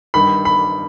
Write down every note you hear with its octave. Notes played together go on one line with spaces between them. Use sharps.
G2 D#3 B5
B5